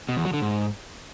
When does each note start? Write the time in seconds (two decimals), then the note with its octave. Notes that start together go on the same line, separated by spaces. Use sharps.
0.09 B2
0.17 E2
0.25 F#3
0.34 D3
0.42 G#2